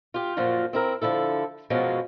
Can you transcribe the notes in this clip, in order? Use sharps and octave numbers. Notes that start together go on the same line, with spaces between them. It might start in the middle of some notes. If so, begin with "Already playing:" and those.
F4 G4
F#2 A#2 F3 F4 F#4
C4 E4 A#4
D3 F3 E4 A4
F#2 B2 F3 F#3 G#3 C#4